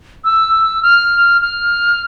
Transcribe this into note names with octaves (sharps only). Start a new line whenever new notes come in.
E6
F6
F6